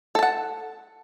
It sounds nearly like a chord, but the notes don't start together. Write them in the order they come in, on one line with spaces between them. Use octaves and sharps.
A4 A5 F#5